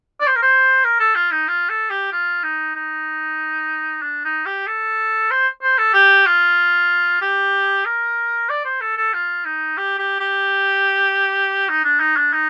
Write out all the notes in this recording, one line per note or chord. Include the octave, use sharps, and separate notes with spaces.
D5
C5
A#4
C5
A#4
A4
F4
D#4
F4
A4
G4
F4
D#4
D#4
D4
D#4
G4
A4
C5
C5
A4
G4
F4
G4
A#4
D5
C5
A4
A4
F4
D#4
G4
G4
G4
D#4
D4
D#4
D4
D#4